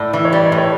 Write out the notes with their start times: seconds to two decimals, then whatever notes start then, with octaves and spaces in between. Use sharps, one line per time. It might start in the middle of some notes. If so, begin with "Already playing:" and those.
Already playing: A2 D5
0.13 E3
0.25 C#5
0.33 G3 D5
0.46 C#5
0.52 A2
0.58 C#5